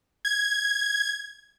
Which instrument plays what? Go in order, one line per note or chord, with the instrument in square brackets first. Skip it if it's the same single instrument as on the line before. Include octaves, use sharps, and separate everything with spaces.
[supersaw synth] G#6